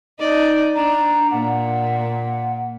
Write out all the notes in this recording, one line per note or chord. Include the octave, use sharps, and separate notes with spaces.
D#4 D5 D#5
D4 A#5
A#2 F#5